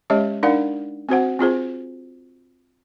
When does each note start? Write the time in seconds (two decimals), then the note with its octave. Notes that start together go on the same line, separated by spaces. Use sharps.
0.10 G#3 C#4 G4 C#5 D#5 E5
0.43 D4 D#4 A#4 D5 F5 F#5
1.09 C4 F#4 C5 F#5
1.39 C4 F4 G#4 C5